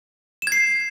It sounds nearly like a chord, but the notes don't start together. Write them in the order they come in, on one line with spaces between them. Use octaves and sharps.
E7 G#6 C7